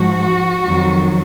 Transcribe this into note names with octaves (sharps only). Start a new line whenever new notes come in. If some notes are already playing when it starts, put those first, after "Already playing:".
Already playing: G#2 F3 F#4
F2 D#3 F#3